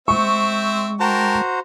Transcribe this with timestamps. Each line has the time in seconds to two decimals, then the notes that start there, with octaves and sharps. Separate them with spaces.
0.08 G#3 C4 C5 E5 C#6
1.00 F#4 A#4 C5 G5 A5 A#5